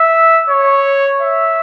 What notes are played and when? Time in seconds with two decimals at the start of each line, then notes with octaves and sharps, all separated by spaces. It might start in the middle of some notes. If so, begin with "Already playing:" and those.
Already playing: E5
0.49 C#5
1.22 E5